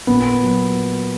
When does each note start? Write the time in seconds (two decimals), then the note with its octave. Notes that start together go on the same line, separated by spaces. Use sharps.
0.07 A#2 B3
0.42 F#3